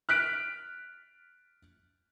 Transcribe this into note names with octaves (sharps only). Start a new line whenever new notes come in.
F6 F#6 B6 D7